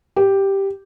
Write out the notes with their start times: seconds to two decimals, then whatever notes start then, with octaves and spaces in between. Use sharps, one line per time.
0.16 G4